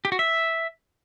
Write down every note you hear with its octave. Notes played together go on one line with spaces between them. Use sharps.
G4
F#4
E5